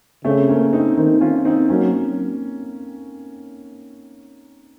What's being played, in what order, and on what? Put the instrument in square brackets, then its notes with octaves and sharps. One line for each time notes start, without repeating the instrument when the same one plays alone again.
[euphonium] C#3 [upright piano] A3 C4
[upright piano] A#3 C#4
C4 D#4
[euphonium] D#3 [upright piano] C4 D#4
[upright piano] C#4 F4
C4 D#4
[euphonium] F#3 [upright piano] A#3 C#4